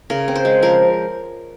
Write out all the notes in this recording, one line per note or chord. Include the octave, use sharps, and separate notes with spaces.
C#3 A#4
C4
C5
G#3
F3 A#4